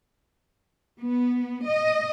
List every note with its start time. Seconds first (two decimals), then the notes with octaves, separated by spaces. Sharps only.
1.01 B3
1.67 D#5